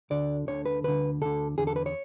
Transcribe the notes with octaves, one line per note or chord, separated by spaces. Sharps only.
D2 D3 D5
D2 D3 C#5
B4
D2 D3 B4
D2 D3 A4
E2 D3 G#4
A4
B4
C#5